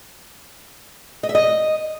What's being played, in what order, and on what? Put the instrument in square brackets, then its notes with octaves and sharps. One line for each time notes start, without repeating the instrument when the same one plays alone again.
[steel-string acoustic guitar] D#5
E5
D#5